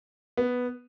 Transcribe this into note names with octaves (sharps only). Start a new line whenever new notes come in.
B3